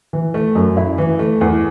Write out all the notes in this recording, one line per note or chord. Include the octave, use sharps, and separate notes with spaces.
E3
A3
F#2
E4
E3
A3
E2